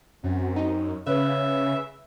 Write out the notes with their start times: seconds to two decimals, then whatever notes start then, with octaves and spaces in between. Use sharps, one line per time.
0.24 F#2 C4
0.56 D#4
1.06 C#3 C#4 B4 E5